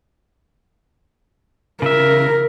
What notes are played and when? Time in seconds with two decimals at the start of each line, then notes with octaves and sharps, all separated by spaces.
1.82 C#3 A#4 E5